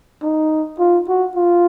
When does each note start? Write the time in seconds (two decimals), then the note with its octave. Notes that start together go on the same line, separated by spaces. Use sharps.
0.22 D#4
0.79 F4
1.08 F#4
1.36 F4